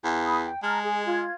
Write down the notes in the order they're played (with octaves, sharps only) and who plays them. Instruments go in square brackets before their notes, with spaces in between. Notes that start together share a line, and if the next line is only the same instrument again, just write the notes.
[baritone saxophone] E2
[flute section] B5 D#6
G5
[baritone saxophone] G#3 [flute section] A5 A#5 F6
[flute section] G#4 D#5
F4 G#6